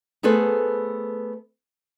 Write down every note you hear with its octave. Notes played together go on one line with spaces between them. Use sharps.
A3 B3 G#4 A4 B4 C5